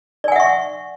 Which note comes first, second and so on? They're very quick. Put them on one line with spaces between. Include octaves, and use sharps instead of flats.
D5 G#5 F#5 E5 C#6